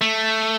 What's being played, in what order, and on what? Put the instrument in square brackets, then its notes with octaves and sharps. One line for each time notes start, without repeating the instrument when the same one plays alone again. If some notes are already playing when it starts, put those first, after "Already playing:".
[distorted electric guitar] A3